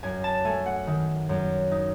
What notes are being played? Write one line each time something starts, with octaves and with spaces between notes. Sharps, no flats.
F#2 G#5
A5
A3 G#5
F#5
D#3
F#2
D#4